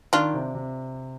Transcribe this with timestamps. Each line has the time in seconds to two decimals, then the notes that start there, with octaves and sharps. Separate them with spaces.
0.13 D#3 D4 F4
0.34 C3
0.55 C3